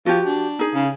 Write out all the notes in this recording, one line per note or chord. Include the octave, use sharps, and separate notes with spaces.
F3 F#4 G4
D4
D#4 G#4
C#3